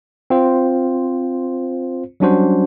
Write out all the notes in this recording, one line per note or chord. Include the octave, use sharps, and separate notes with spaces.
C4 F4 C5
F#3 G3 C#4 D4 F#4 C5